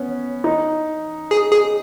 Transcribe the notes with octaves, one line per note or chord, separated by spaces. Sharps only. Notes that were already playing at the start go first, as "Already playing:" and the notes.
Already playing: B3 C#4
D#4
G#4
G#4